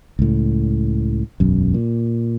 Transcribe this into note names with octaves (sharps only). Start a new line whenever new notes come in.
C#2 A2
E1 B1 F#2
A#2